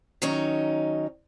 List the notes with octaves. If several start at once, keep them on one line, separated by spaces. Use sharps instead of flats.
D#3 F#3 C#4 D#4